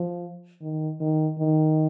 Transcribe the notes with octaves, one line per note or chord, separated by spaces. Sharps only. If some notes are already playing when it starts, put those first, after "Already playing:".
Already playing: F3
D#3
D#3
D#3